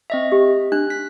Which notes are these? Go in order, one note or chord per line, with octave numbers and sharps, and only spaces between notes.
C4 D#5 E5
G4
D4 F#6
B6